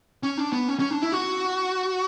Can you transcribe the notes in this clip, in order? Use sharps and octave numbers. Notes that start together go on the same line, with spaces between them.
C#4
D4
B3
C#4
C#4
D4
E4
F#4